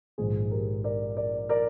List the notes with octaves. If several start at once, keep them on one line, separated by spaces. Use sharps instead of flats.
A#1 G#2 D#3 G#4
G4 A#4
A#4 D5
A#4 D5
A#4 D5